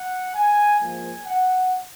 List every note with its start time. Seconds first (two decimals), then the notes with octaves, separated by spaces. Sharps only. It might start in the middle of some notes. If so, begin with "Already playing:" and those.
Already playing: F#5
0.35 G#5
0.80 G#2 F3 A#3 G#5
1.26 F#5